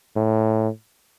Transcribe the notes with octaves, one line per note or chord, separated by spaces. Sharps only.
A2